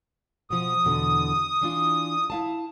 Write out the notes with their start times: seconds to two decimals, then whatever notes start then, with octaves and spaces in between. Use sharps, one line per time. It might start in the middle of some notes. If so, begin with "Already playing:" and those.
0.50 B2 F3 D#6
0.85 E2 B2 D3
1.61 E3 D4 F4
2.30 E4 F5 A5